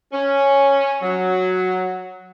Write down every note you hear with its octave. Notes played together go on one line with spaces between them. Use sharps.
C#4
F#3